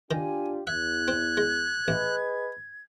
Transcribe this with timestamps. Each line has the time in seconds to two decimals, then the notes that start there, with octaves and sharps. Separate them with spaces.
0.11 D#3 D4 F4 G4 G#5
0.67 E2 E5 F#6 G#6
1.08 C4
1.37 G#3
1.88 A1 G#4 B4 D#5